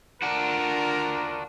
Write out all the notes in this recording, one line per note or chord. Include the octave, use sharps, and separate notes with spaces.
D4 F4 F#4 A#4